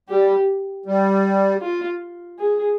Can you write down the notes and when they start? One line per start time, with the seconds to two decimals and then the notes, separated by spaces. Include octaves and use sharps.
0.09 G3 G4
0.86 G3
1.62 F4
2.39 G#4